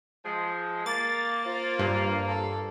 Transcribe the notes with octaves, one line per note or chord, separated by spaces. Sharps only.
F3 G#3
A#3 A6
F4 C5
G2
A4